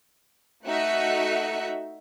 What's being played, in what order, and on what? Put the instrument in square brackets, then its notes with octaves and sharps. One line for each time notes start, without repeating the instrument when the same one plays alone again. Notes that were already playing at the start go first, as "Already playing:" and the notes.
[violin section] A3 D#4 F#4 E5 F#6 C#7